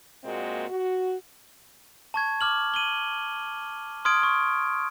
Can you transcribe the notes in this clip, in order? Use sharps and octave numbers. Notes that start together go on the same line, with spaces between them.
A#2 G#3 A#3 C4 F#4 D#5
F#4
A5 C#6 G#6
D6 F6 F#7
D#7 F#7 G7
C6 D#6 F6 G#6 D7
C#6